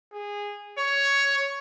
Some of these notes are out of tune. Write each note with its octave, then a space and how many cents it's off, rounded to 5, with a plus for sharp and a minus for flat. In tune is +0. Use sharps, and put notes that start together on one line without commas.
G#4 -15
C#5 +10